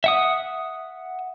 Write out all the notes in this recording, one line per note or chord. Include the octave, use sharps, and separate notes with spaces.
E5 F#5 D#6